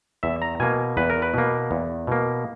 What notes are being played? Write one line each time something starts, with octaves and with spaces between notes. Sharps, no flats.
E2 E5
A#5
B2 A#3 G#5
E2 B4
A#4
B4
B2 A#3
E2
B2 A#3